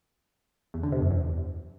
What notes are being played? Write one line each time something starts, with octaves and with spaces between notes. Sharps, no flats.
E2
D3
C3
F#2
E2